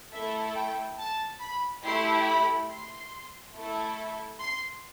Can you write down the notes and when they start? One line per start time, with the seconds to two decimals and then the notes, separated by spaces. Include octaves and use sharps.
0.13 A3 E4 A4 E5
0.56 G5
0.99 A5
1.41 B5
1.84 A3 E4 G4 C6
2.26 B5
2.69 C6
3.54 A3 E4 A4
4.40 C6